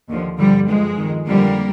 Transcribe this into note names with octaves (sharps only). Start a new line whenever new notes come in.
D#2 D3 F3
G2 D3 F3 G3
G2 F3 G#3
F2 D#3
F2 D3 F3 G3 A#3